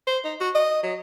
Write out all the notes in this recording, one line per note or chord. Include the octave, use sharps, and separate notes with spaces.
C5
D#4
F#4
D#5
F#3